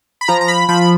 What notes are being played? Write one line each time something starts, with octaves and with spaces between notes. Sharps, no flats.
B5
F3 A#5
A#5
B5
F3 B5